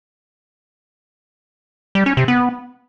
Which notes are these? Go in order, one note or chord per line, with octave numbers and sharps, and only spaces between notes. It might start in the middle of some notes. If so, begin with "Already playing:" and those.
G3
C#4
C3
B3